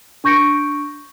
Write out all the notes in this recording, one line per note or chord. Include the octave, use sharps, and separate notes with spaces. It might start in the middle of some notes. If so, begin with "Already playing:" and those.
D4 C#6 G6 A#6 C#7 D7